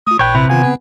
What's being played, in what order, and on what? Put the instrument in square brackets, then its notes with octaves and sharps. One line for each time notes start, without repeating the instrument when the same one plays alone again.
[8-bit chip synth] A3 F4 [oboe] D#6
[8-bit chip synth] A1 A#2 [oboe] B4 [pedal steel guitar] C#5 G5
[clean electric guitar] C3 [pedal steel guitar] E4
[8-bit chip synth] D#3 F4 F5 [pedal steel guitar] B3 [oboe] G#5
[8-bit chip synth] C#3 C4